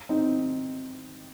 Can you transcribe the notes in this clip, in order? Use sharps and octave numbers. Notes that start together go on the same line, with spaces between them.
C4 D#4